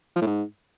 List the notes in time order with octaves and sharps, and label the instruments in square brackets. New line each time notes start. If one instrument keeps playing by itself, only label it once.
[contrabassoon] F3
A2
G#2